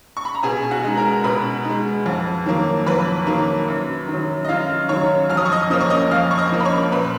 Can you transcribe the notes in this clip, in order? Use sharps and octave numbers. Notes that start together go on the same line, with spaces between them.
C#6
B5
A#5
B2 G#4 G#5
F#4 F#5
G#3 D#4
A#4 A#5
B2 B4 B5
G#3 D#4
F2
D#3 F#3 A#3
F2 B4 B5
D#3 F#3 A#3
F#2
D#3
F#3
D#5
F#2 F4 F5
D#3 F#3 C#5 C#6
F2 F6
D#6
C#6
D#5 D#6
F3 A#3 C#4 D#6
C#6
D#5 D#6
F2 F5 F6
C#6
D#5 D#6
F3 A#3 C#4
B5
C#5 C#6
A#2 B4 B5